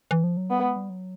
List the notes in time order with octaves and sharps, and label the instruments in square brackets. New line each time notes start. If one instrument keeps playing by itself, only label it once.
[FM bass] E3
F3
F#3
[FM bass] G3 [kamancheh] B3
[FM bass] G#3
G3
F#3